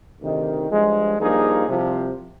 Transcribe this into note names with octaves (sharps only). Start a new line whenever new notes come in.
D2 C3 D#3
G2 F3 G#3
G2 F3 A#3 D#4 G#4
C2 C3 F3